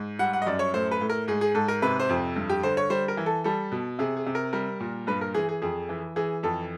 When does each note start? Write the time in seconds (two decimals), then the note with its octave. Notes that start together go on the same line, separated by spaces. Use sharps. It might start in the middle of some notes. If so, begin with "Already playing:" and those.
Already playing: G#2
0.19 G3 F#5
0.33 F#5
0.42 D#5
0.46 F#2 D5
0.59 C#5
0.74 A2 C5
0.91 B4
1.01 A2
1.10 A#4
1.28 G#2 G#4
1.41 G#4
1.55 G#2 A4
1.68 A#4
1.82 C3 B4
2.00 C5
2.09 F2
2.36 G2
2.50 G4
2.63 D3 C5
2.77 C#5
2.90 G3 C5
3.08 A#4
3.17 E3
3.26 A4
3.44 G3 A4
3.72 B2
3.99 C3 G#4
4.17 G#4
4.26 C3
4.35 A#4
4.53 G3 A#4
4.80 A#2
5.07 G2 B4
5.21 A#4
5.34 E3 G#4
5.49 G#4
5.62 F2 G#4
5.89 E3
6.16 E3 G#4
6.43 F2 A4